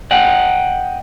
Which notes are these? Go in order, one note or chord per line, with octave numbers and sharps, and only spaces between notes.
D#5 F#5 G5